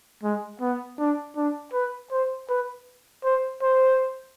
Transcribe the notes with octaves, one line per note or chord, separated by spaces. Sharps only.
G#3
B3
D4
D4
B4
C5
B4
C5
C5